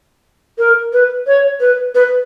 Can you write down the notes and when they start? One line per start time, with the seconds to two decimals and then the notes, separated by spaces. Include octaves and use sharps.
0.59 A#4
0.93 B4
1.27 C#5
1.60 B4
1.95 B4